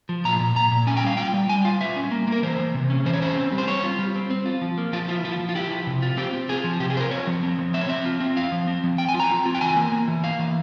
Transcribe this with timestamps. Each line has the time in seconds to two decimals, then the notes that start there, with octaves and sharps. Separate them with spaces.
0.09 F3
0.24 A#2 A#5
0.40 A#2
0.55 A#2 A#5
0.72 A#2
0.87 C#4 G#5
0.97 G5
1.03 G3 F5
1.17 F4 G5
1.34 G3
1.49 G3 G#5
1.65 F4 F5
1.81 G3 E5
1.96 C#4
2.11 A#3
2.28 A#3 A#4
2.43 E3 C5
2.59 E3
2.74 C3
2.90 C#4
3.06 E3 C5
3.13 C#5
3.22 C#4 C5
3.37 C4
3.52 G3
3.58 C5
3.67 C4 C#5
3.84 F4
3.99 G3
4.15 C4
4.30 C4
4.45 F4
4.62 F3
4.78 A#3
4.93 F3 F4
5.08 E4 F4
5.24 F3 F4
5.40 F3
5.49 F4
5.55 E4 G4
5.71 F3
5.87 C3
6.02 F4
6.17 C4 G4
6.34 C4
6.49 F4 G#4
6.64 F3
6.80 C3 G4
6.90 G#4
6.96 F4 C5
7.00 A#4
7.11 C4 C#5
7.27 F3
7.43 C4
7.59 F3
7.74 C4 E5
7.81 C#5
7.89 C4 E5
8.06 F4
8.20 C4
8.36 F4 F5
8.52 F3
8.67 C4
8.84 F3
8.98 F3 G5
9.09 G#5
9.14 F4
9.20 A#5
9.30 C4
9.46 F4
9.55 G5
9.61 E3 G#5
9.76 A#3
9.92 A#3
10.08 E3
10.23 A#3 F5
10.39 E3